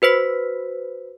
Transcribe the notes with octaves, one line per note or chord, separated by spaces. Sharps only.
F#4 B4 C5 B6